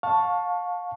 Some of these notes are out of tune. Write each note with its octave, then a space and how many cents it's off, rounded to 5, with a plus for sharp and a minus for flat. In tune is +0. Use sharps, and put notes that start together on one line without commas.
F5 +30 A5 +0 C#6 +0